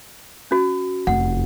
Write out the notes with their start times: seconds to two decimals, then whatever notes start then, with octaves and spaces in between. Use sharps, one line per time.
0.51 C#4 F#4
1.07 F1 E2 F#5